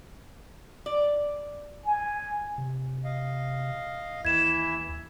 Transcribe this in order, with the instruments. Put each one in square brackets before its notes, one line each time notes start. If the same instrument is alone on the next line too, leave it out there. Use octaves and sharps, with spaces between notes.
[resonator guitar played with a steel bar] D5
[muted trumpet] G#5
[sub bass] C3
[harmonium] D#5 F5
[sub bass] D#2 [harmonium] E3 E4 E5 [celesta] G#6 E7